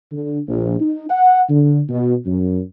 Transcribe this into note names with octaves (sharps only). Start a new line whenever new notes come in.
D3
A#1
D#4
F#5
D3
B2
F#2